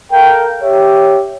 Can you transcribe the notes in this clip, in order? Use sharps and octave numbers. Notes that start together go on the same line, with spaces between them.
A4 A#4 F5 G5
G4 C#5 E5